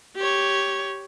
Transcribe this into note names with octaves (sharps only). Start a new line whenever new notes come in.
G4 C#5